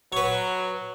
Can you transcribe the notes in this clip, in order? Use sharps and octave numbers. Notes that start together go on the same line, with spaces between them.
F#3 B4 C#5